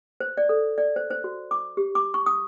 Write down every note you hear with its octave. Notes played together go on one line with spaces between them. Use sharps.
C5
D5
A4
D5
C5
C5
F#4
D6
G4
D6
C#6
D#6